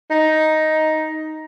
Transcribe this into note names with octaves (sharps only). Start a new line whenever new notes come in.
D#4